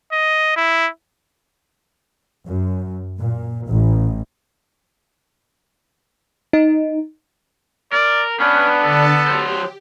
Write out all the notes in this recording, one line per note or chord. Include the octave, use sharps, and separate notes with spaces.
D#5
E4
F#2
A#2
A1
D#4
A#4 D5
B3 C#4 D4 B4
D3 A4 D5 A5
F#3 G4 C5